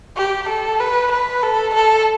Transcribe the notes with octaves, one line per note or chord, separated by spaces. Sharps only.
G4
A4
B4
B4
A4
A4